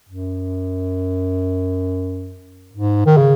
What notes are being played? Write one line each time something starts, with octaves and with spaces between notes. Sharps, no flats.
F#2
G#2
D#3
C#3